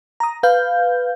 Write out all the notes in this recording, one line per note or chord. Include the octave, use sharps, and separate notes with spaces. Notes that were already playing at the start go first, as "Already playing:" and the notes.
A#5 D#6
B4 F5 G6